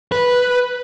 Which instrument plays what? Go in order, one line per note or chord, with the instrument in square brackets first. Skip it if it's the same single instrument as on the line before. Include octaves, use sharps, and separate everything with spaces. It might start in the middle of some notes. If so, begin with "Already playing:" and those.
[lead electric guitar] B4